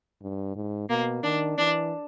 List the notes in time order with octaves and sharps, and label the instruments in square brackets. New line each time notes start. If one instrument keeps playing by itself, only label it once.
[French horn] G2
G#2
[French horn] B2 [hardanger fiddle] A#3
[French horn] D#3 [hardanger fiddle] D4
[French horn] E3 [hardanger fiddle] D4